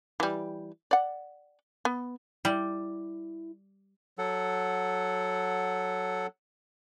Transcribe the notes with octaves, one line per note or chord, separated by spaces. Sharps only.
E3 G3
D5 F#5
B3
G3 E4
F#3 A4 F#5